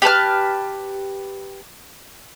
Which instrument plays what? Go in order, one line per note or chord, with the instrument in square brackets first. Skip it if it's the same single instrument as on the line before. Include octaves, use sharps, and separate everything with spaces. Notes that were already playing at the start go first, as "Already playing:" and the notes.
[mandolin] G4 B4 A5 F6